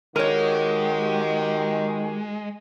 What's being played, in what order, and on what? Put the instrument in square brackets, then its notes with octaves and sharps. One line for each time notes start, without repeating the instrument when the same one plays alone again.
[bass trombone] D#3 [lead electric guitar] G#3 [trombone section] F#4 G4 [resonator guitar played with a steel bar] A#4 C#5